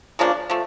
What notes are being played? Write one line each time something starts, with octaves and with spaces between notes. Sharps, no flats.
C#3 F3 A#3 D4
F3 A3